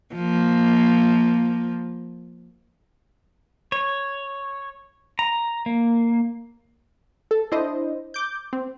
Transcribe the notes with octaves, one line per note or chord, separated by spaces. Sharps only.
F3 A#3
C#5
A#5
A#3
A4
D4 E4 C5 D#5
D6 G6
C4